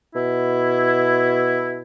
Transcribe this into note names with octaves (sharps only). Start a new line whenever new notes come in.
B2 E4